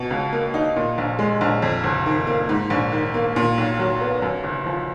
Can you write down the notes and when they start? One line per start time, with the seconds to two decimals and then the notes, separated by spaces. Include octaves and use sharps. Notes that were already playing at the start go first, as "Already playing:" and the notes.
Already playing: B2
0.10 C#2
0.33 A#3
0.54 D#4
0.76 A#2
0.98 A#1
1.19 G#3
1.41 A#1
1.62 F2
1.84 F#1
2.06 D#3
2.27 A#3
2.49 G#2
2.70 A#1
2.92 D#3
3.14 A#3
3.36 A#2
3.58 B1
3.79 F#3
4.01 B3
4.22 F#2
4.44 F#1
4.66 F3